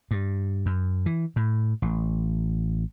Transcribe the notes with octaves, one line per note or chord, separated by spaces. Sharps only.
G2
F#2
E3
A2
A1